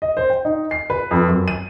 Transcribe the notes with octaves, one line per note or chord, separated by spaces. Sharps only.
D#5
C5
G5
D#4
C7
B4
F2
F#2
D#7